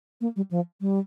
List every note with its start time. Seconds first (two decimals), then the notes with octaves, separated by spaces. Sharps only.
0.21 A#3
0.36 G3
0.51 F3
0.81 G3